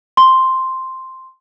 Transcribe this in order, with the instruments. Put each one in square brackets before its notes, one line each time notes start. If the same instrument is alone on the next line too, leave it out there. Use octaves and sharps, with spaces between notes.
[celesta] C6